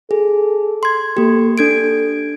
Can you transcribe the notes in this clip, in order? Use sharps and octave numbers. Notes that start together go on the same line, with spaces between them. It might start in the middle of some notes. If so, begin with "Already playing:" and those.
G#4 A4
C6 G#6
A#3 G4 A4
D4 A4 G#6 D7